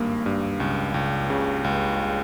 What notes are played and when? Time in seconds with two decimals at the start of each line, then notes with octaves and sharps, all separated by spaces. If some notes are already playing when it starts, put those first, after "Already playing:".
Already playing: G#1 G2 A#3
0.26 G2
0.60 C#2
0.94 C#2
1.30 C#3
1.64 C#2